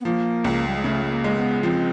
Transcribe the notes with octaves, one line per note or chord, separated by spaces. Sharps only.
B3
F3 A#3
C#2
G3
G#3
C#3 A3
A3
A#3
G#3
B3
F3 C4